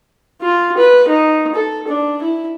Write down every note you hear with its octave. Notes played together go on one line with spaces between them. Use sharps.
F4
B4
D#4
A4
D4
E4